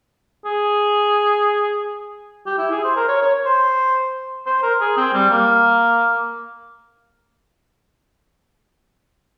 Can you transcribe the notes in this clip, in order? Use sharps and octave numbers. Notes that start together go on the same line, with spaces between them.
G#4
G4
E4
G#4
C5
A#4
C#5
C#5
C5
C5
A#4
G#4
C4
G3
A#3